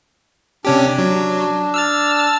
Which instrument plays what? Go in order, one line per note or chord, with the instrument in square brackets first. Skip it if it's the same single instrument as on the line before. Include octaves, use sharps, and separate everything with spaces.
[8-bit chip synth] C3 C#4 G4 [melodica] D4
[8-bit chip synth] F#3
E6 F6 A6